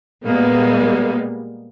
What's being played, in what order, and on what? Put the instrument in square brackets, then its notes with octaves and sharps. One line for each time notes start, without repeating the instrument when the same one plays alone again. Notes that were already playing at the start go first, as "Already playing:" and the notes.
[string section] A#2 G3 G#3 A#3 B3